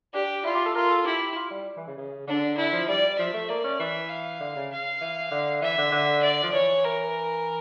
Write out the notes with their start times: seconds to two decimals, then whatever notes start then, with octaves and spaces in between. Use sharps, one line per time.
0.14 D4 G4
0.44 E4 F4
0.55 G4
0.66 A4
0.75 F4 A#4
0.91 A4
1.06 E4 G4
1.36 F4
1.51 G3
1.77 E3
1.87 C#3
1.97 C#3
2.27 D3 D4
2.57 D3 E4
2.72 F3
2.88 G3 D5
3.18 F3 E5
3.34 A3
3.49 A#3 D5
3.64 C#4
3.79 E3 E5
4.09 F5
4.40 D3
4.56 C#3
4.71 F5
5.01 E3
5.31 D3
5.62 E3 E5
5.78 D3
5.92 D3
6.22 D5
6.43 F3
6.53 E3 C#5
6.84 A#4